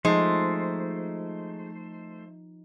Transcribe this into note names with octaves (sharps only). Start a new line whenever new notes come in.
F3 G#3 A3 D#4 C5